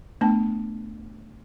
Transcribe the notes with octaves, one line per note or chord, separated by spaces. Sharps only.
A3 B3 D4 G5 A5